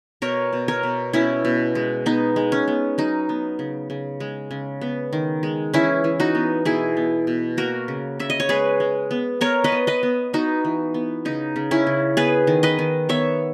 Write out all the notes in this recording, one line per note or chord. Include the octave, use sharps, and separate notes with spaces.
B2 A#4 C#5
B2
A#4 C#5
B2
B2 C#4 E4
B2
G#3
B3 D#4
G#3
C#4
B3
F#3 D#4
B3
C#3
C#3
G#3
C#3
B3
D#3
G#3
E3 C#4 E4
E3
D#4 F#4
B3
B2 E4 G#4
B3
B2
A#3 F#4 A#4
C#3
C#3 E5
D#5
C#5
G#3 G#4 B4
G#3
B3
B3 A#4 C#5
B4 D#5
B3
B4 D#5
B3
B3 D#4 F#4
E3
B3
C#3 D#4
C#3
C#4 E4
C#3
B3 G#4 B4
D#3
B4 D#5
D#3
B3 C#5 E5